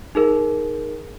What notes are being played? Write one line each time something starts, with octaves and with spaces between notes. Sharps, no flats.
D#4 G#4 A#4